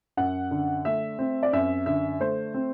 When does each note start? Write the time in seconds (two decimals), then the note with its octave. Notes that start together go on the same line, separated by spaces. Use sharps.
0.17 F#2 F#5
0.51 D3
0.85 A3 E5
1.19 C4
1.43 D5
1.53 F#2 E5
1.86 D3 E5
2.20 A3 C5
2.54 C4